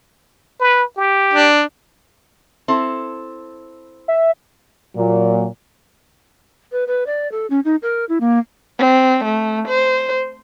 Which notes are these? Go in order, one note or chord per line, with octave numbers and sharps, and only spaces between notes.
B4
G4
D4
C4 E4 A4
E5
A#2 F#3
B4
B4
D5
A4
C#4
D#4
A#4
E4
A#3
C4
A3
C5